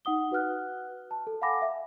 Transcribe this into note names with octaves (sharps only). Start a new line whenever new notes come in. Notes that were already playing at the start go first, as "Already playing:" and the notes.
D#4 F#5 D#6 G7
F#4 B4 F#5 F6 F#6
A5
A4
F5 F#5 G#5 B5 D6 A#6
E5